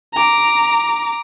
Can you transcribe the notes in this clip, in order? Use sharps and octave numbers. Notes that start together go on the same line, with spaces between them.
A#5 D6